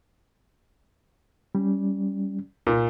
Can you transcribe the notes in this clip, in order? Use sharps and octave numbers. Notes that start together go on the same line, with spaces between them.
G3 C#4
C2 A#2